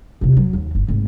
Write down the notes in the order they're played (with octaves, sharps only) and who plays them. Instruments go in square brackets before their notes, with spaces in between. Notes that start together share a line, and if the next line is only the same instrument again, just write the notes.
[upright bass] E2 C3
F#3
D#2
G1
G#1 A2